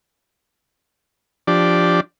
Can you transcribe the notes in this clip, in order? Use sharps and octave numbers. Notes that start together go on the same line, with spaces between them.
F3 D4 G4 D5